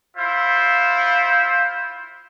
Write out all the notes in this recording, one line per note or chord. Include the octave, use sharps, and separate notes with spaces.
E4 F4 C5 E5